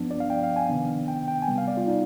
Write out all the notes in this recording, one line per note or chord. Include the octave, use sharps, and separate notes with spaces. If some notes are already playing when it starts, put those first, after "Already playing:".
Already playing: G2 F3 B3 D4
D5
F5
G5
F5
G#5
C3 D#3 B3 D4
G5
G5
G#5
C3 G3 B3 G5
F5
D5
F4
D#4